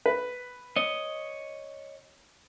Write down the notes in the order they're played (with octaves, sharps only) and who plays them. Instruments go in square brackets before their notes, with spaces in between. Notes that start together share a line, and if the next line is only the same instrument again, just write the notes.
[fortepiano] B4
[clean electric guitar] C#5 D#5